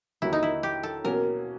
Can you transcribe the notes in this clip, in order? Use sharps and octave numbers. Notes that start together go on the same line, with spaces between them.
D#2 D3 F#3 A#3 E4
D#4
E4
G4
A4
B2 F#3 A#3 C#4 A#4